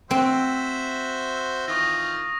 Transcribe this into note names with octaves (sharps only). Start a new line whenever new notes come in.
C4 F#4 C5 E5
D#3 E3 F4 C#6 D#6 A#6